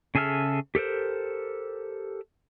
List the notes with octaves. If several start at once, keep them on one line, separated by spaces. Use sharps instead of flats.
C#3 G#4 A4 E5 F6
G4 A4 A#4 C5